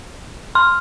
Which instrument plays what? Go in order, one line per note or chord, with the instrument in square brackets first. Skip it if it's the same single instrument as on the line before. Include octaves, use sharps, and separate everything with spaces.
[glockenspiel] C6 [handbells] F6